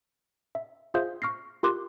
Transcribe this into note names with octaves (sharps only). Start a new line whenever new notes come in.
E5
F4 G#4 C5 E5 F5 G6
C#6 F6 A#6 C7
F4 G4 A#4 C6 D6 F#6